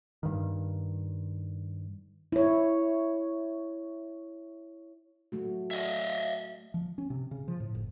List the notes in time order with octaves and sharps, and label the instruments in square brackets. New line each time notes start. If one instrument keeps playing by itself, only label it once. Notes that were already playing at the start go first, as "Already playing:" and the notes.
[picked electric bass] G2 D#3
[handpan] E4 C#5
F#3 A3 F#4
[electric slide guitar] D#5 E5
[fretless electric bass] F3
C#4
C3
C#3
F3
A2
F#1